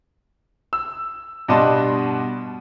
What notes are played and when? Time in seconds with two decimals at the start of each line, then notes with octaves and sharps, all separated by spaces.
0.73 E6
1.48 G2 B2 D4 D#5 A5 C6